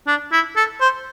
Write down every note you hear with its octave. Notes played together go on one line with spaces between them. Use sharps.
D4
E4
A4
C5